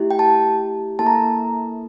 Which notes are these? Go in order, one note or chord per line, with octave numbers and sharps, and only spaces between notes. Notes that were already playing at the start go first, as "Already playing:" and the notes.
Already playing: A3 E4 G4
G5
A5
A#3 E4 A4 A5
A#5